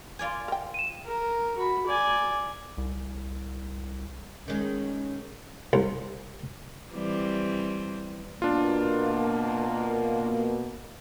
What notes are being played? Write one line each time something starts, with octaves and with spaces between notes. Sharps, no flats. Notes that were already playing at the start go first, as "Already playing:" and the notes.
F4 D5 G#5
A#4 G5
D#7 E7
A#4
F#4 B5
D5 G#5
C2
D#3 G#3 C#4
C2
E3 G3 C4
B2 A#3 D4 F4